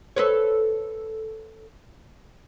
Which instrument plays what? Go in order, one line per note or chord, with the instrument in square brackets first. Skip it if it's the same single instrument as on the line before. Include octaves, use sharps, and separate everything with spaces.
[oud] A4 B4 C#5